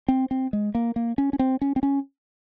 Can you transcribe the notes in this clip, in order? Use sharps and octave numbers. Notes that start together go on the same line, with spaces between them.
C4
C4
G#3
A#3
A#3
C#4
C#4
C4
C#4
C4
C#4